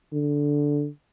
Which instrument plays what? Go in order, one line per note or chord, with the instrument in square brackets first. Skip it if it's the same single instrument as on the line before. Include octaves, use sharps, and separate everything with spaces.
[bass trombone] D3